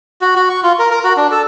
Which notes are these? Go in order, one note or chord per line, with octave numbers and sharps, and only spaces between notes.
F#4
F#4
C#6
F4
A#4
A#4
F#4
D4
A4